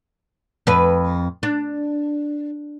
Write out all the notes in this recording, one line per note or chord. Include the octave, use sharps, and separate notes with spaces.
F2 B4
D4